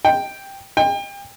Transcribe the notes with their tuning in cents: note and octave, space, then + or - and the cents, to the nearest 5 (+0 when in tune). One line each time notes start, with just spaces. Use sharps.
G5 +0
G5 +30